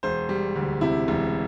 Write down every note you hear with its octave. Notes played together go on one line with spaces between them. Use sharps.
E1 C5
G3
D2
C3 E4
E1